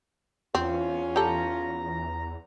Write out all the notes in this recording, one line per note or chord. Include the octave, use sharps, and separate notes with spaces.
E2 C4 C#4 F4
G4 A4 A#5